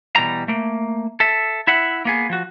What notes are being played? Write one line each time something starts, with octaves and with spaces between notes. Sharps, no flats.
B2 E3 G3 A#5
A3 A#3
A4 E5
E4 E5 F#5
A#3 B3 G#4
F3 F#4